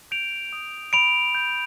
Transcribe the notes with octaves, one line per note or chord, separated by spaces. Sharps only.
G6 D7 F7
D#6
B5 D7 F7
G6